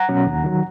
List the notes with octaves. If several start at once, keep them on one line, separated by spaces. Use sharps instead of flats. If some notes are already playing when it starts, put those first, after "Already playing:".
Already playing: F#5 A#5
B2 F#3 C#4
D#2
D#3 F#3